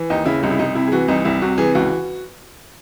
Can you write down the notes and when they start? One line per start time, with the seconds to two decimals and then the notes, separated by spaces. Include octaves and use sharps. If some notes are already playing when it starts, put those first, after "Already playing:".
Already playing: E3
0.10 D#2 D#4
0.26 C#3 E4
0.43 C2 D#4
0.51 E4
0.59 C2 D#4
0.75 C3 E4
0.87 G#4
0.92 E3 F#4
1.08 C2 D#4
1.25 C2 E4
1.42 C3 F#4
1.58 E3 G#4
1.75 C#2 F#4